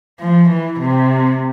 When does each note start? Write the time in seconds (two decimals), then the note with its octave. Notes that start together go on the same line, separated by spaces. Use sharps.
0.19 F3
0.49 E3
0.80 C3